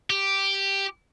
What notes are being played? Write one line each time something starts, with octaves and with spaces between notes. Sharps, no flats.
G4